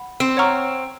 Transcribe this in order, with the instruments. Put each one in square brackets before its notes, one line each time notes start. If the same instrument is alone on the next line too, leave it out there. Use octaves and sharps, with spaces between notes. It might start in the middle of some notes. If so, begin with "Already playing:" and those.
Already playing: [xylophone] F#5 B5
[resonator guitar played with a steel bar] C4
[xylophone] C#5 F#5 A#5 C#6 F6